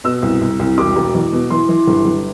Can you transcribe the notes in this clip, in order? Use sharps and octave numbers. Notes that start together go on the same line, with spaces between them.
B2 E6
C2
C2
C2
E1 D6
E1
E2
B2
E3 C6
E3
G1
G1